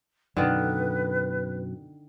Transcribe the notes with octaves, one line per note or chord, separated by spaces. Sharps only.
F#2 B2 D3 D#3 B4